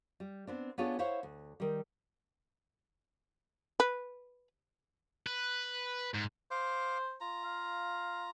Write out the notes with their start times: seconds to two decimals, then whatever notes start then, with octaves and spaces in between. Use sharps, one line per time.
0.20 G3
0.47 B3 C4 D4
0.78 B3 D4 F4 G#4 A4 C#5
0.99 E4 C5 C#5 F5 F#5
1.23 D2
1.60 D#3 G3
3.80 B4
5.27 B4
6.14 G#2
6.51 C5 F5 D6
7.21 F4 A#5
7.44 F5